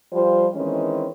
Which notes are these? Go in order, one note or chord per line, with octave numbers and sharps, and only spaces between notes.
F3 G3 F4 C5
D#3 E3 G#3 C4 C#4